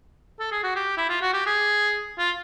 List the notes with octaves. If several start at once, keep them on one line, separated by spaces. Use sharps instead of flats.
A4
G#4
F#4
G4
E4
F4
F#4
G4
G#4
F4